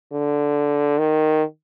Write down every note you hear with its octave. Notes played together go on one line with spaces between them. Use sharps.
D3
D#3